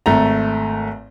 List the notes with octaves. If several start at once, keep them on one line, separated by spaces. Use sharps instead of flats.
G#1 A3 A#5